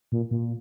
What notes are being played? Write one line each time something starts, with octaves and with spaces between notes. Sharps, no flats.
A#2
A#2